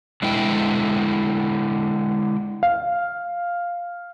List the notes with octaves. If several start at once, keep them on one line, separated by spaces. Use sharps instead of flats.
D3 G#3 B3 E4 G5
F5